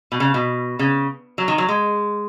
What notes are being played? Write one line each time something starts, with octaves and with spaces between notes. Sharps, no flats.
B2
C#3
B2
C#3
F#3
D#3
F#3
G#3